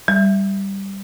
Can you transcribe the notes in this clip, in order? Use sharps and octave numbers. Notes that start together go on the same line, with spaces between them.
G3